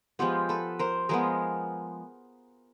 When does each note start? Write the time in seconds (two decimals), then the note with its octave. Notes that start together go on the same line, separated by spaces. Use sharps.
0.19 F3 G#3 B3 F4 G4
0.49 A4 B4
0.79 A#4 C5
1.09 F3 G#3 B3 G#4 A#4